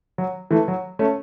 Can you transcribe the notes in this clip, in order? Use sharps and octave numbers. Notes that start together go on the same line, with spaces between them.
F#3
E3 A3
F#3
A3 C#4